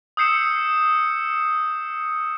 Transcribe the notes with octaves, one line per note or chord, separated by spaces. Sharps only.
D#6 E6 G6 C7 C#7 E7